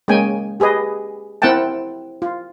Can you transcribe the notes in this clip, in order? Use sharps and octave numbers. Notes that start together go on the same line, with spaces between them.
G#3 A#3 C#4 G5 G#5
G4 G#4 B4 D#5
C4 E4 A#4 F#5 G5 A5
F4